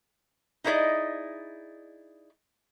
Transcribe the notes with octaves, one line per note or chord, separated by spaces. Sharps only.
D#4 E4 G#4 C5 D5 D#5